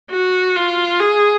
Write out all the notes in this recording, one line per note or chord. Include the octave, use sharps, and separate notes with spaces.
F#4
F4
G#4